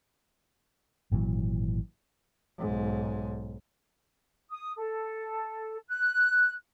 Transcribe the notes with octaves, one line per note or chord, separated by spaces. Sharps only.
G#1 A#2 E3 F#3
B1 G#2
D#6
A4
F#6